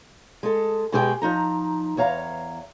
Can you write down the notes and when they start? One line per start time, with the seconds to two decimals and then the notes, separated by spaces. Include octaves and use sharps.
0.43 G#3 A4
0.92 B2 G#3 G4 G#4 D#5 G5
1.22 F3 D#4 A#5
1.97 E2 C#5 F5 A#5